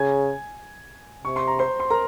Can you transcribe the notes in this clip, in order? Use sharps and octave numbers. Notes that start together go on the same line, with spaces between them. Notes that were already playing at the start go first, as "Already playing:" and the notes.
Already playing: C#3 G#5 G#6
C3 C#6
C6
A#5
C5 C6
C6
A#4 A#5